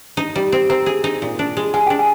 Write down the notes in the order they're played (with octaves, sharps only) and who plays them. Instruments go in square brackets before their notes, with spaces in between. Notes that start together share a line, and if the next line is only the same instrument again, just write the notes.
[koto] D#4
G3
C4
[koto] C4 [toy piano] A#4 A#5
[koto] G#4
D#4
A#2
D4
G#3
[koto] G#3 [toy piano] G#5
[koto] D4 [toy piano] G5
[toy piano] G#5